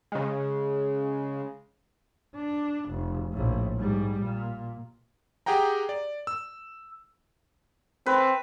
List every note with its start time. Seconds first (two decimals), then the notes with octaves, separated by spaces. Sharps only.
0.12 C#3 G#3
2.36 D4
2.90 F1
3.33 A#1 A2
3.78 G#2 G3
4.21 A#2
5.46 G4 G#4 F#5 G5 A#5
5.89 D5
6.27 E6
8.06 C4 B4